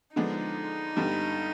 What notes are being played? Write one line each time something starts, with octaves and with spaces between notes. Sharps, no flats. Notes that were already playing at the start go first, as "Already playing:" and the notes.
D3 F3 G#3 B3 D4 D#4
G2 D3 G3 B3